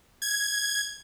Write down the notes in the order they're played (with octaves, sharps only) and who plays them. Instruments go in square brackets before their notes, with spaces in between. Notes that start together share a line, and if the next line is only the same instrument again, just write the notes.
[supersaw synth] G#6